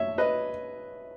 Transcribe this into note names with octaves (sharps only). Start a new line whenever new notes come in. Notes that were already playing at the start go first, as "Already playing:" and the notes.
Already playing: C#5 E5
B4 D#5